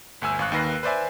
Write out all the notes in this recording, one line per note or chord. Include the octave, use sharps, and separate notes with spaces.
G1 D2 G#5 E6
G#1 F5 C#6 F#6
D#2 D#3 B4 A#6 C7
B4 C5 D5 E5 G#5